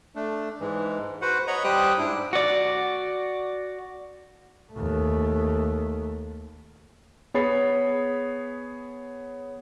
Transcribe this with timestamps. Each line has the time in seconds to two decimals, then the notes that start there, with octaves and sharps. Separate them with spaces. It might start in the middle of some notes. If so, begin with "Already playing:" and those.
0.15 A3 D4
0.60 G#2 E3 G#3
1.22 F#4 B4 C5 F#5
1.47 C#5 D#5 F#5 A#5 B5 C#6
1.64 G3 G4 C5 G5 D#6 F#6
1.98 G#2 D4 E4
2.33 F#4 D5
4.73 D#2 A3
7.34 B3 G#4 C#5 B5 A6 C7